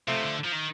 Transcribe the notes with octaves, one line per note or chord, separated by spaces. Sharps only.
C3 F3 A3
D3
F3
D#3